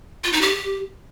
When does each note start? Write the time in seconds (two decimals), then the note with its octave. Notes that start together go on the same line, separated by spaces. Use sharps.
0.24 F4
0.33 D#4
0.41 G4